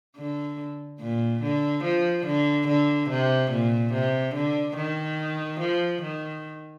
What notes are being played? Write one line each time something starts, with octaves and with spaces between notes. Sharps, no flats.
D3
A#2
D3
F3
D3
D3
C3
A#2
C3
D3
D#3
F3
D#3